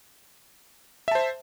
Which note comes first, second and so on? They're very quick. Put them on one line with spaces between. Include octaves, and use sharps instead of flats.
E5 A5 C5